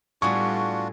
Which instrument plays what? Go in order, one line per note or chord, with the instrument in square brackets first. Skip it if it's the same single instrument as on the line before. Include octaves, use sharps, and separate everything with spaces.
[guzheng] A2 B3 G#4 [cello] G3 [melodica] D4 F4 F#4 [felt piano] C#6